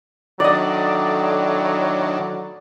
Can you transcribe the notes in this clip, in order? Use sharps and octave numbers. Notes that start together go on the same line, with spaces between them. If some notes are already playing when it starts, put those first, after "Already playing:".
A2 D#3 F#3 D4 D5 D#5